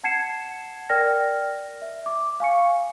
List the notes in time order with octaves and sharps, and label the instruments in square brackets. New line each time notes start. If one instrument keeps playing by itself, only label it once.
[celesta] F#5 A5 G#6 C7 C#7 E7
A#4 D5 G5 F6 A#6
E5
D6
F5 G#5 C#6 C#7